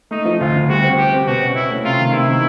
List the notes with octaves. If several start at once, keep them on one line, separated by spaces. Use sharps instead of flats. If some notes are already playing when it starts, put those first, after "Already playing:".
A3 D#4
F3
D2 F4
D2
G3 F#4
C4
C4 G4
C4
B2 F#4
C#4
C#4 E4
A3
C3 F4
D#3
C3 E4
D#3